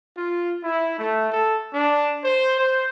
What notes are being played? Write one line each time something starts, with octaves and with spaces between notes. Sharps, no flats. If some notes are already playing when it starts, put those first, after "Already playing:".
F4
E4
A3
A4
D4
C5
C5